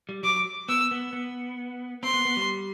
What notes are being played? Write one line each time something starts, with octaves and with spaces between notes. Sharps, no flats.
G3
F#3 D6
B3 E6
B3
B3
C4 C6
B3
B3
G3